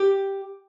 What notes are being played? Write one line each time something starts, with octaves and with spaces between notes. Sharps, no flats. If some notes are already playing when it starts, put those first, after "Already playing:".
Already playing: G4